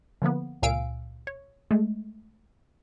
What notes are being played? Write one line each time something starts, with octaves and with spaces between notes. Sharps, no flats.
D3 F3 A#3 B3
C#2 A#2 F5 G#5 E6 D7
C#5
G#3 A3